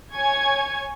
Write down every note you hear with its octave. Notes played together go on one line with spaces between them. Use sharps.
C#5 G#5 C#6 G#6